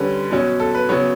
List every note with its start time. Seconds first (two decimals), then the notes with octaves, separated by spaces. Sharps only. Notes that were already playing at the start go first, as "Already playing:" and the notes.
Already playing: D3 G3 C#4 B4
0.31 B2 F#3 C#4
0.60 A4
0.74 B4
0.89 C#3 F#3 B3 C#5